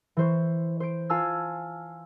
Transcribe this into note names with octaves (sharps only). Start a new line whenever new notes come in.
E3 C5 C#6
C5 D7
F4 F5 G#5 A5 E6 F6